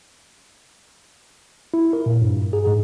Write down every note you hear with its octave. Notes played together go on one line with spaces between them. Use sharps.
E4
A#4
A#2
G2
G#4
G#2